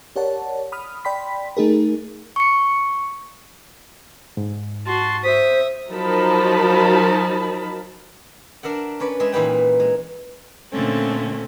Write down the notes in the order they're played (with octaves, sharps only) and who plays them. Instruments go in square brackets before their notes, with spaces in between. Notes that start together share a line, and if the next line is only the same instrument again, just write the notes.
[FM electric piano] G4 A#4 C#5 D5 F#5 A5
B5 D#6 F6
D5 G5 B5 C6 B6
A3 D#4 G#4 A#4
[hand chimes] C#6 C#7
[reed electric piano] G#2
[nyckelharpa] F#4 A5 [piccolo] C6
[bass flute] C5 [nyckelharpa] E5 D#6 [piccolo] B6
[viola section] F3 F#3 D#4 A#4 A5 B5
[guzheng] D4 A#4 E5 F#5
C#4 B4 D5
G#3 G#4 B4 E5
A#2 E3 D#4 B4 G5
G#3
[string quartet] A#2 D3 A3 C4 C#4 A4